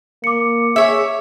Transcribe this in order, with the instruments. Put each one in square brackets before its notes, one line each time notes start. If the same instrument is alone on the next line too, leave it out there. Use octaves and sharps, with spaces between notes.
[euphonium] A#3 [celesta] D6 C#7
[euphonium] G#4 [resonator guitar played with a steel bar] C#5 E5